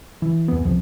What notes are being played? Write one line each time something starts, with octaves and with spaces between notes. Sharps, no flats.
E3
E2 B3
C2 F2 F3